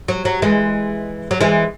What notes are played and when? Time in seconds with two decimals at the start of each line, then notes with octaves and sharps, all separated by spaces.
0.08 F#3
0.25 F#3
0.42 E3 G#3
1.31 F#3
1.41 E3 G#3